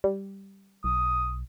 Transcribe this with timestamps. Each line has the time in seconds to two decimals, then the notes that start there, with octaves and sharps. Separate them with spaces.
0.04 G3
0.84 B1 D#6